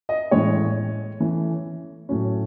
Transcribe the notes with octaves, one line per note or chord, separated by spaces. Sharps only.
D#5
A2 E3 G#3 C#4 C#5
E3 A3 C#4
A2 F#3 C#4